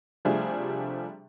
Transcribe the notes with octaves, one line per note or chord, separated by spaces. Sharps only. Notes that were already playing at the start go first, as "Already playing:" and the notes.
C3 F3 G3 A3 D4 G#4